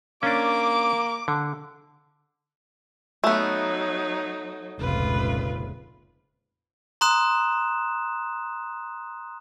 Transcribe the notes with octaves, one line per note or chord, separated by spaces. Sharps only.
A#3 C#4 D4 D6
D3
F#3 A3 B3 D#4
F1 C#2 A#2 F4 B4
A#5 C6 D#6 F#6 E7